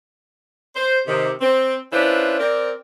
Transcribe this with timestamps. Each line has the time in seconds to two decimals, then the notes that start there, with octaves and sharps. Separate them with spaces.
0.76 C5
1.07 C3 D#3
1.41 C4
1.92 C#4 D4 E4 F4 B4 C5
2.39 C4 A#4 D5